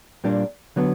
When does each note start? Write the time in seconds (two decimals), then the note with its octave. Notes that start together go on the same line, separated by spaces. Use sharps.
0.24 A#2 G3 A#3 D4
0.76 D3 F#3 B3